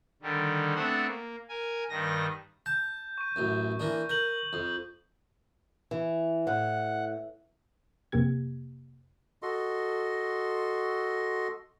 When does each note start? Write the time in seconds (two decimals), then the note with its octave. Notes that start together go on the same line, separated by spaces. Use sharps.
0.22 D3 D#3 G3
0.75 A3 B3 C4 D4 C5 F#5
1.07 A#3
1.49 A#4 G#5
1.90 G2 D#3 A#6
2.66 A5 G6
3.18 C#6 D#7
3.36 A1 F#2
3.80 E3 A#3 D4
4.09 A#4 G6 F#7
4.53 F2
5.91 E3
6.47 A2 F#5
8.12 F2 C3 A#3 G4 G#6
9.42 F#4 A4 D#5 C6